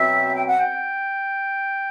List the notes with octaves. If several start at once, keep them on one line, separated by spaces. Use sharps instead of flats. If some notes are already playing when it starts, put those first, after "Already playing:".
Already playing: B2 F#3 C4 E5
G5
F#5
G5